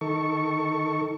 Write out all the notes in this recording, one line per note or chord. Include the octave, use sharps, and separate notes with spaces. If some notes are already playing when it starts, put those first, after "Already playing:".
D#3 A4 C#6